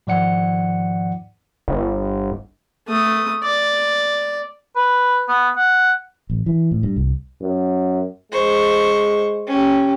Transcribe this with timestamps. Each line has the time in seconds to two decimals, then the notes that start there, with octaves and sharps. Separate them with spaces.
0.07 G#2 D#3 F3 D5 F#5 C#7
1.68 G1
2.88 A3 D#6
3.43 D5
4.76 B4
5.29 B3
5.56 F#5
6.30 A1
6.46 E3
6.71 A2
6.83 G2
6.96 C2
7.41 F#2
8.32 G#3 C5 C#6
9.47 C#4 G4